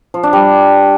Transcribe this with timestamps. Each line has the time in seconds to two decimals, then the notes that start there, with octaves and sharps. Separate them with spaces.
0.14 F3
0.23 D4
0.33 G3